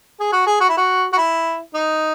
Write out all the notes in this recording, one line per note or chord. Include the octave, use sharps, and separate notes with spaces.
G#4
F#4
G#4
F#4
E4
F#4
F#4
E4
D#4